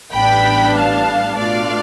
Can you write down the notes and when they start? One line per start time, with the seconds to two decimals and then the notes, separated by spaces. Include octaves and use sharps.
0.13 A1 A2 G3 B3 D4 G5 B5
0.76 F5 A5
1.39 B2 A3 D4 F4 D5 F5